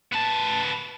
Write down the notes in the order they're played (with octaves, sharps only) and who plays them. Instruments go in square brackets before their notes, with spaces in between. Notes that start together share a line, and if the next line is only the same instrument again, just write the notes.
[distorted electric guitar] B3 A5